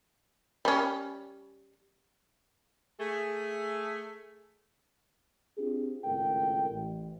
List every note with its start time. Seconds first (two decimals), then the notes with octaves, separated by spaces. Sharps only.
0.65 G3 C#4
2.99 A3 G#4
5.57 C4 D4 F4 G4 G#4
6.04 G#1 C#2 A2 A4 A#4 G5
6.70 A1